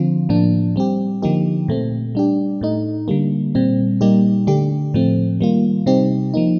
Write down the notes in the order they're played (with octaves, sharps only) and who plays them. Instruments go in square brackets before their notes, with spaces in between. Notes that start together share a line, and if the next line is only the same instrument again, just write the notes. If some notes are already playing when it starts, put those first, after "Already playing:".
Already playing: [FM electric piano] D3 F3 C4 F4
A2 F3 A#3 D4
G3 C4 G4
D3 F3 A#3 D#4 G4
A#2 A3 C4
G3 D4 G4
A2 A3 D#4
D3 G3 A#3
A#2 G3 C4
A#2 G3 A#3 D#4 G4
D3 A3 D4 G4
A2 F3 A3 C4
D#3 G3 A#3 F4
C3 G3 C4 D#4 G4
F3 A#3 D#4